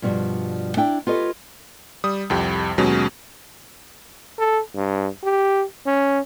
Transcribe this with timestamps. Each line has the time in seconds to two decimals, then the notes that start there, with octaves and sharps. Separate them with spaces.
0.02 G2 B2 F3 G3
0.77 D4 E4 G5
1.07 F4 G4 A4 B4 C#5 D#5
2.04 G3 D#6
2.30 C2 F2 G4
2.78 D#2 B2 F#3 G#3 C#4
4.39 A4
4.74 G2
5.24 G4
5.86 C#4